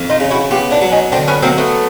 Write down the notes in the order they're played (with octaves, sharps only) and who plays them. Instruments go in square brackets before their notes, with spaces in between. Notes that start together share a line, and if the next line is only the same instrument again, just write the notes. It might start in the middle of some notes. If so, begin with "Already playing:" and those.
Already playing: [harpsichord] F2
[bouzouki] D#4 F4
[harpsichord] C#3
[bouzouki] E4 F#4
[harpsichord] B3 [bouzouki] F4 G4
[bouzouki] D4 E4
[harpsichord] F#3
[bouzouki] C#4 D#4
[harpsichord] D3 [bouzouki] C4 D4
[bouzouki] B3 C#4
[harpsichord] F#3 [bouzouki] A#3 C4
[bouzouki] A3 B3